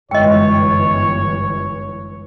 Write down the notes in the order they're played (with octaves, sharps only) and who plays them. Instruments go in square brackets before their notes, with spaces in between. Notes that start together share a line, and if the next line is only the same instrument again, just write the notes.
[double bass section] G1 E3 [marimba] F#2 G#3 E6 [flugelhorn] C#5 [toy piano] D#5 G5